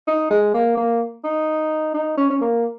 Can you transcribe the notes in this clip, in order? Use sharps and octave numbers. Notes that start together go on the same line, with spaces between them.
D#4
G#3
A#3
A#3
D#4
D#4
C#4
C#4
A#3